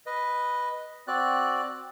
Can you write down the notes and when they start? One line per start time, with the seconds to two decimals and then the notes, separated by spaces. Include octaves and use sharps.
0.06 B4 D#5
1.08 C4 F#4 D5 F#6